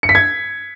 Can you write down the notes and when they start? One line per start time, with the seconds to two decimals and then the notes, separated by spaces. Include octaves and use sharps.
0.03 C#7
0.09 B6
0.15 G#6